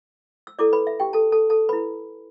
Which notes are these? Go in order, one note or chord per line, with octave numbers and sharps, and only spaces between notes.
E6
E4 A4 D5 D6
B4 B5
E5
G4 G5
A4 A5
A4 A5
A4 A5
E4 B4 B5